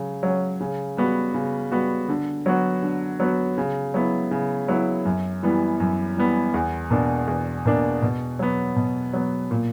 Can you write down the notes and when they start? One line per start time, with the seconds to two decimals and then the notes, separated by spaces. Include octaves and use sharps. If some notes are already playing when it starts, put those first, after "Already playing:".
Already playing: C#3 F#3
0.23 F#3 C#4
0.60 C#3
0.97 G3 B3 F#4
1.34 C#3
1.72 G3 B3 F#4
2.09 D3
2.46 F#3 B3 F#4
2.83 D3
3.20 F#3 B3 F#4
3.58 C#3
3.94 F#3 B3 E4
4.31 C#3
4.68 F#3 B3 E4
5.05 F#2
5.43 E3 G3 B3
5.80 F#2
6.17 E3 G3 B3
6.54 E2
6.91 B2 A#3 D4
7.28 E2
7.66 B2 A#3 D4
8.02 B2
8.39 F#3 B3
8.76 B2
9.13 F#3 B3
9.51 A#2